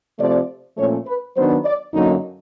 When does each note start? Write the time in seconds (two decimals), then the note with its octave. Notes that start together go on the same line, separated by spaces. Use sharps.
0.18 C3 F3 A3 D5
0.76 A#2 F3 A3 C#4 C#5
1.06 B4
1.35 D#3 F#3 B3 D4 C5
1.65 D5
1.93 F#2 D3 F#3 A#3 D#4